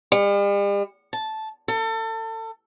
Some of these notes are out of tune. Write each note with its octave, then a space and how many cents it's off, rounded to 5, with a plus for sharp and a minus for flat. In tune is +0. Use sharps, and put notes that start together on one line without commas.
G3 +45
A5 -10
A4 +30